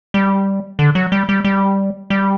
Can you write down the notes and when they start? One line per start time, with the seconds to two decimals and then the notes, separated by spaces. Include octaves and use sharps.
0.14 G3
0.79 D3
0.95 F#3
1.12 G3
1.29 G3
1.44 G3
2.10 G3